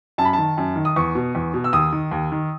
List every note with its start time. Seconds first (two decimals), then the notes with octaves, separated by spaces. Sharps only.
0.18 F#2 A5
0.25 B5
0.33 D#3 A5
0.58 F#2
0.76 D#3
0.85 D#6
0.96 E2 C#6
1.15 B2
1.35 E2
1.54 B2
1.64 E6
1.73 D#2 D#6
1.93 D#3
2.11 D#2
2.32 D#3